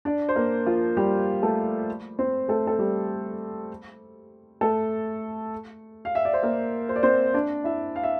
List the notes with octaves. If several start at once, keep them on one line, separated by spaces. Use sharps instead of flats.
D4 D5
C5
A#3 A#4
F3 F4
G3 G4
A3 A4
C4 C5
A3 A4
A4
G3 G4
A3 A4
F5
E5
D5
C5
A#3 A#4
C5
D5
C4 C5
D4 D5
E4 E5
F5
E5